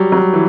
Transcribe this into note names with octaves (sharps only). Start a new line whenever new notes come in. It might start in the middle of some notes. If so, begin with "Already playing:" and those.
Already playing: F#3 G3
F#3
G3
E3